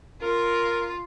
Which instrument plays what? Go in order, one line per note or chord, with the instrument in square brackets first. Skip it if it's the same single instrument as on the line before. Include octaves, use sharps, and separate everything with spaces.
[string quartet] F4 [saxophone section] A#4